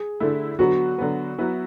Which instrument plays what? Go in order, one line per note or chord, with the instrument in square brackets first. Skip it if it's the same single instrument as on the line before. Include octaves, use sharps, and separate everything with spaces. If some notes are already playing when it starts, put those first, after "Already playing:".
Already playing: [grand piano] G#4
[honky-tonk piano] D3 A3 E4
[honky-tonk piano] D3 F#3 B3 [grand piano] F#4
[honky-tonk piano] D3 F#3 B3
F#3 B3 E4